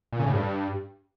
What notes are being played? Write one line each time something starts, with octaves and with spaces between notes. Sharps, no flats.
A#2
C#3
A2
G2